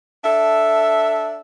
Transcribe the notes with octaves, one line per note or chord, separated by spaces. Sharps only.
D4 A4 E5